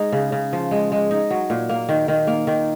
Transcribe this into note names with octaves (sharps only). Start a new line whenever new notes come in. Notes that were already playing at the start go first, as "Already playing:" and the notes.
Already playing: G#3 D#4
C#3
C#3
F3
G#3
G#3
D#4
F#3
A#2
A#3
D#3
D#3
A#3
D#3